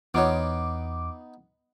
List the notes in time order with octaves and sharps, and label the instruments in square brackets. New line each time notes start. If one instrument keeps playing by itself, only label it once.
[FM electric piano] E2 D6 [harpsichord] B3 D#4 F#5 [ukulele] F4 C#5